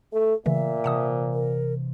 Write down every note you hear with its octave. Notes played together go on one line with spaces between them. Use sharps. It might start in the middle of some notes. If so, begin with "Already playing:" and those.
A3 A4
A#2 C#3 E3 A3 E5
C3 E3 F#5 A5 D#6
A#4